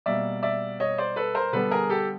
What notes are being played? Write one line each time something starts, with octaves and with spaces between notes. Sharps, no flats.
B2 G3 A#3 D5 E5
D5 E5
C#5 D#5
C5 D5
A4 B4
A#4 C5
D3 G3 B3 A4 B4
G#4 A#4
G4 A4